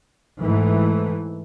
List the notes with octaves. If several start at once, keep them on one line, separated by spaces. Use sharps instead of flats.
G#2 E3 A3